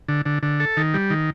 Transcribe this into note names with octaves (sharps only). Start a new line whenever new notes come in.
D3
D3
D3
A4
D#3
G3
D#3